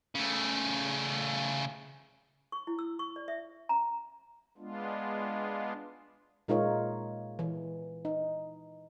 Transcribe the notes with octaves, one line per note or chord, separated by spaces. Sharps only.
C#3 A3
C#6
E4
E6
C#6
D5
E5
A#5
G#3 B3 D4 F4
A#2 G#3 D#4 F4 A#4 C#5
E3
D#4